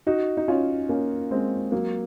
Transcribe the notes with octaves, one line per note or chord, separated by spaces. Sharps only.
D#4 F#4
D#4
C#4 F4
A#3 C#4
G#3 C4
F#3 A#3